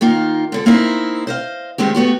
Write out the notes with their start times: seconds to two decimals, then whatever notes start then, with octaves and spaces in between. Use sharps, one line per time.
0.01 D#3 A#3 D#4 F4
0.52 G#2 D3 A4
0.66 A#3 C4 D#4 E4 A#4
1.27 C5 D#5 F5
1.78 G2 D#3 G#3 C4 G4
1.95 A3 B3 F#4 G4